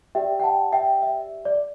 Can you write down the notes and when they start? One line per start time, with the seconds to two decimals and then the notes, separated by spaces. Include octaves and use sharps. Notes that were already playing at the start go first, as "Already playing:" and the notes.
0.15 G4 D5 E5 G5
0.40 G5
0.43 F#5 A5
0.72 E5 G5
1.02 E5
1.45 D5